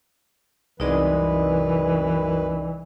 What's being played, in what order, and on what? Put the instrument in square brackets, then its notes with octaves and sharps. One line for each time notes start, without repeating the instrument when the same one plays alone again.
[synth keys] C2 G#3 [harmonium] F#2 B4 [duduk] E3 [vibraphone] D#4 D5 D#5